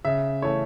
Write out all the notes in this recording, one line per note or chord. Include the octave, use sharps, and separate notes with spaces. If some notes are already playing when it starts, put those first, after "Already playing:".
C#3 E5
E3 A3 C#4 C#5